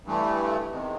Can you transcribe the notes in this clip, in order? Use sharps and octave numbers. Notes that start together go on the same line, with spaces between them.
G2 E3 A3
E2 C3 D#3 G#3